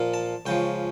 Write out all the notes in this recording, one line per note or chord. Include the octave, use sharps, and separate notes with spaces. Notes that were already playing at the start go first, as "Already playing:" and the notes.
Already playing: A#2 F3 A#3
A5
C#2 C#3 F3 G5